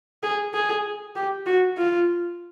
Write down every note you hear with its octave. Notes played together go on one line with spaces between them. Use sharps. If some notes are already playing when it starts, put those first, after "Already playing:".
G#4
G#4
G4
F#4
F4